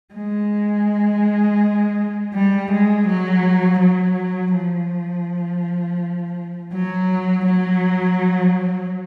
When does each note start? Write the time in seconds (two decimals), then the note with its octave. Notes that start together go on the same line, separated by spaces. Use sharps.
0.15 G#3
2.34 G3
2.71 G#3
3.07 F#3
3.80 F#3
4.53 F3
6.73 F#3
7.46 F#3